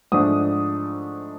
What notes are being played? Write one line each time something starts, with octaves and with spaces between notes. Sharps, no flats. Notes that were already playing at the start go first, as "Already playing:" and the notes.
G#2 F3 A3 D4 D#6